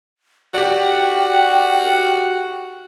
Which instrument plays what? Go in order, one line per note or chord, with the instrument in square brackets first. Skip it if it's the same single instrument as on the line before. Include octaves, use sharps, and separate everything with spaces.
[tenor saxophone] F#4 [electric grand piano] G4 D5 [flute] G5